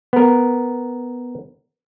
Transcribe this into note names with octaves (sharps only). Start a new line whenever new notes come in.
B3 A#4